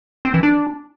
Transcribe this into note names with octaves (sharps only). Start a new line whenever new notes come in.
C4
E3
D4